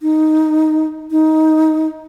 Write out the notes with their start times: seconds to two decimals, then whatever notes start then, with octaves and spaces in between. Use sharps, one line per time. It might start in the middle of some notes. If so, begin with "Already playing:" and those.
0.02 D#4
1.11 D#4